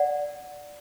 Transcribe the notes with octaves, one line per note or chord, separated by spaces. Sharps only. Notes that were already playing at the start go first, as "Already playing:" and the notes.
Already playing: D5 F#5